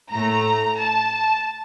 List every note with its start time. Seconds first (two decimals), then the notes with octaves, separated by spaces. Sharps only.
0.11 A2 A3 A#5
0.79 A5